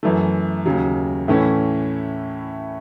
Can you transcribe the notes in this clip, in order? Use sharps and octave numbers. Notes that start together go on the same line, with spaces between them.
F#2 E3 A3
D#2 C#3 F#3
A2 E3 A3 C#4 E4